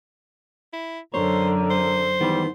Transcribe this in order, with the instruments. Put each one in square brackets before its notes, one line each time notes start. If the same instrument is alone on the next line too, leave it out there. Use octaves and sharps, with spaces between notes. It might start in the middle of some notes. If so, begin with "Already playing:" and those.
[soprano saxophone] E4
[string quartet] F#2 D3 [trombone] A#4 [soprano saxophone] C5 [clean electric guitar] C#5
[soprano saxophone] C5
[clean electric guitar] D#3 E3 B3 [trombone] G3